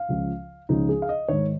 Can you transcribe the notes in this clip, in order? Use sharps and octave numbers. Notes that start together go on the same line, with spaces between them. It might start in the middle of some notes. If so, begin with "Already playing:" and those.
Already playing: F5
C#2 C#3 F3
C#2 C#3 F3 D#4
G#4
F5
D#5
G#2 D#3 C#5